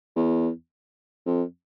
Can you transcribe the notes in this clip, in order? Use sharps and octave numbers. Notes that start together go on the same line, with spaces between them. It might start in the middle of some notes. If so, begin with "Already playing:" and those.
E2
F2